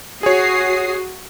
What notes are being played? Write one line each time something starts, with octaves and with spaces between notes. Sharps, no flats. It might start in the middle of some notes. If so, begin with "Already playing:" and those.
F#4 G#4 C#5 D#6 C7